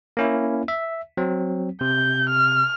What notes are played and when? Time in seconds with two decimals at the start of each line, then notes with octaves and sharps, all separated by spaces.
0.17 A#3 C#4 E4
0.68 E5
1.17 F#3 C4
1.81 C3 G6
2.29 F6